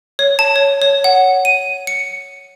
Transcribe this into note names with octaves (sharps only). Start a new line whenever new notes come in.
C#5
A5
C#5
C#5
F#5
D#7
C#7